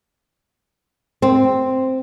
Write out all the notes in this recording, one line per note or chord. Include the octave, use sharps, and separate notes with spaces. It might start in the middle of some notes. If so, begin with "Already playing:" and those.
C4